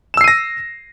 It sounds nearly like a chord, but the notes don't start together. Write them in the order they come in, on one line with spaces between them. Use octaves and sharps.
E7 E6 C7 D#7 A#6